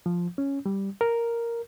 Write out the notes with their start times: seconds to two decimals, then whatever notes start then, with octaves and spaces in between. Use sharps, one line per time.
0.06 F3
0.38 C#4
0.66 G3
1.01 A#4